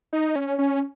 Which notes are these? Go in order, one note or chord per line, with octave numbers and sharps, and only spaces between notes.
D#4
C#4
C#4